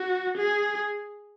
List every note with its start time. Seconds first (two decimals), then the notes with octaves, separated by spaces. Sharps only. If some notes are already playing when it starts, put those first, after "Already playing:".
Already playing: F#4
0.37 G#4